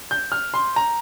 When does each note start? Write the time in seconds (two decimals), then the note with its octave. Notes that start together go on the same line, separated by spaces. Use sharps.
0.11 G6
0.32 F6
0.54 C6
0.76 A#5